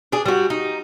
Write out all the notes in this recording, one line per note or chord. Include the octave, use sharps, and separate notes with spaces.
D4 G#4
G3 F#4
D#4